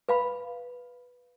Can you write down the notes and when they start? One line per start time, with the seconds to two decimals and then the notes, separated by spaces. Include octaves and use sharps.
0.09 B4 F5 B5